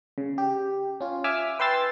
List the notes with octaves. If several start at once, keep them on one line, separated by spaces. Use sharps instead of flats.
C#3
G4
C#4 F4
E5 G#5 D6 E6 F6
B4 G5 C6 E6 A6